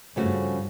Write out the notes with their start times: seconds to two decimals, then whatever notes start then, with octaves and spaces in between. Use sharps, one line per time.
0.16 G2 C#3 F3 A3 C#4 F#4